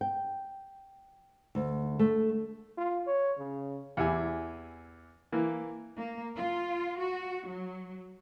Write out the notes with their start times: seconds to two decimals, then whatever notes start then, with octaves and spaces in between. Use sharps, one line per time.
0.01 G5
1.55 D2
1.99 A3
2.78 F4
3.07 C#5
3.38 C#3
3.97 E2 E4 G4 G#5
5.32 E3 A#3
5.97 A#3
6.36 F4
6.99 F#4
7.47 F#3